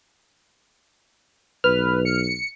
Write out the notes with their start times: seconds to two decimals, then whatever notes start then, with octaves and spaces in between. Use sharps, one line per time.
1.64 B1 B4 F6
2.05 C#7